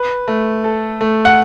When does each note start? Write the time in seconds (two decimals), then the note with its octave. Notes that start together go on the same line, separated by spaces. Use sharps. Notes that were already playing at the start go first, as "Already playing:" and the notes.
Already playing: B4
0.28 A3
0.64 A4
1.01 A3
1.25 F#5